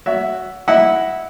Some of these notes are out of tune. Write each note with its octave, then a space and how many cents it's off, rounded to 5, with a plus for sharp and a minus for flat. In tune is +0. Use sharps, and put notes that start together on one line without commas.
F#4 +0 C#5 +35 E5 +0
E4 -10 D#5 +0 F#5 +0